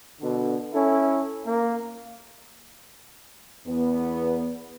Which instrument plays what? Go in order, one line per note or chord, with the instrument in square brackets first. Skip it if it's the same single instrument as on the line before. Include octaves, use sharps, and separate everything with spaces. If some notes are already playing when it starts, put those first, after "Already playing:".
[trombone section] B2 D3
C#4 E4 A4
A#3
[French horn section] E2 B3